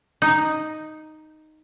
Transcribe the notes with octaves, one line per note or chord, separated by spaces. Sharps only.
D#4